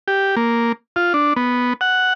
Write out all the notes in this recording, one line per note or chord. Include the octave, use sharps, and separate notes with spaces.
G4
A#3
F4
D4
B3
F#5